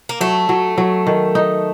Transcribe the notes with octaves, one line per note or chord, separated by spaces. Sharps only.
A#3
F#3 A3
F#3
F#3
D#3
D#4